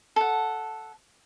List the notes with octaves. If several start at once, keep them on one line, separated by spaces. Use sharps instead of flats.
A4 F#5